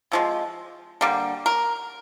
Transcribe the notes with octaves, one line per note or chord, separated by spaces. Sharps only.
C3 F3 G#3
D3 G3 A#3
A#4